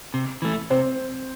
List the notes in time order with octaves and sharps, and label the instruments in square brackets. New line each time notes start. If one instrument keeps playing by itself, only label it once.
[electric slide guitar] C3
E3 A3
[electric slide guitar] C3 [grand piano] C4 C5